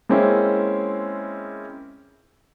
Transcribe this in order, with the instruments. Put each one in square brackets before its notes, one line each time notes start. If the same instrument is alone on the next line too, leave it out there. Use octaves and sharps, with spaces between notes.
[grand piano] G#3 A#3 C4 C#4 E4